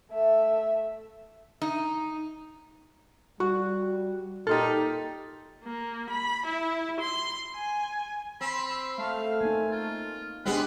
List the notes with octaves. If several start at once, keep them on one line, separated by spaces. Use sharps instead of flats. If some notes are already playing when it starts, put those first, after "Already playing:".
A3 E5
D#4
G3 F#4 C#6
A#2 D#4 G4 A4 C6 F6
A#3
B5
E4
C6
G#5
C4 B5 E6
A3 F5
A#3 D#4 G#5
F4
G#3 B3 C4 D4 G4 B4 D#5